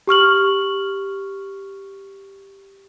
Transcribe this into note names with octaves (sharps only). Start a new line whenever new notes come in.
G4 C#6 F6 F#7